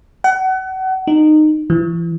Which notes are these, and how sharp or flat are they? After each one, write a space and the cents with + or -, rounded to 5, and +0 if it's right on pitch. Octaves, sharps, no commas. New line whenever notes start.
F#5 +30
D#4 -20
E3 +35